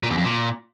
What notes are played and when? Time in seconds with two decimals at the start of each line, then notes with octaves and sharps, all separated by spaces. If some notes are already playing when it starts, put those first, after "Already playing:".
0.03 A#2
0.10 E2
0.17 F2
0.25 A#2